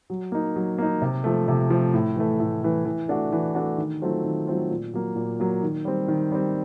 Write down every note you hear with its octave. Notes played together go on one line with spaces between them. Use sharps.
F#3
A#3 D#4
F#3
A#3 D#4
C3
F3 A3
C3
F3 A3
A2
E3 A3
A2
E3 A3
E3
A3 D4 F#4
E3
A3 D4 F#4
D#3
F#3 A3 C4 F4
D#3
F#3 A3 C4 F4
A#2
F#3 A#3
A#2
F#3 A#3
D#3
G3 C4
D#3
G3 C4